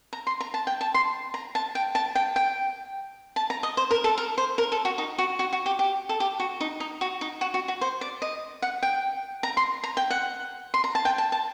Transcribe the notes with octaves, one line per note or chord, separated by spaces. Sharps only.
A#5
C6
A#5
A5
G5
A5
C6
A#5
A5
G5
A5
G5
G5
A5
A#5
D#5
C5
A#4
A4
A#4
C5
A#4
A4
F#4
D#4
F#4
F#4
F#4
G4
G4
A4
G4
F#4
D#4
D#4
F#4
D#4
F#4
F#4
F#4
C5
D5
D#5
F#5
G5
A#5
C6
A#5
G5
F#5
C6
A#5
A5
G5
A5
A5